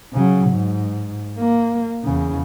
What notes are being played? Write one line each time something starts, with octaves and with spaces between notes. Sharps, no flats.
C#3 F#3
G#2
A#3
E2 C#3